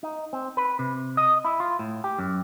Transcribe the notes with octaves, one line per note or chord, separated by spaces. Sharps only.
D#4
C4
B4
C3
D#5
E4
F4
A2
G4
F#2